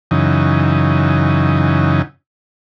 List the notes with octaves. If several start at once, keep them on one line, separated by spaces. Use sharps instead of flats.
F#2 C#3 E3 D#4